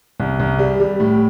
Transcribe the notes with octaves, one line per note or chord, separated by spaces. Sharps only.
C2
C2
G3
G3
A2